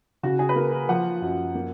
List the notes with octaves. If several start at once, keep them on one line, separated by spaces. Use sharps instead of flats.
C#3 F#4
G#4
B4
A#3 A#4
A#4
F3 F#5
F#2
A#3